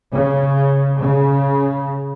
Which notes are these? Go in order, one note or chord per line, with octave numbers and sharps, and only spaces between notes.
C#3
C#3